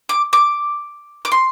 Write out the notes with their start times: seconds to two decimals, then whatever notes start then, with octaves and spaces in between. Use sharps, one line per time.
0.09 D6
0.33 D6
1.25 D6
1.32 C6